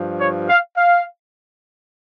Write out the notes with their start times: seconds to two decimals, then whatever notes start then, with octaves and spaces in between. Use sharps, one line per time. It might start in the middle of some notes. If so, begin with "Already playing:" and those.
Already playing: G2 F3
0.20 C#5
0.49 F5
0.76 F5